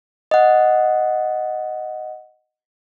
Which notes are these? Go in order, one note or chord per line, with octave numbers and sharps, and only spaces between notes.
D#5 F#5